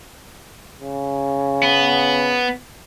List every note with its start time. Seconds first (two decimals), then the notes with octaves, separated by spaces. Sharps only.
0.82 C#3
1.63 B3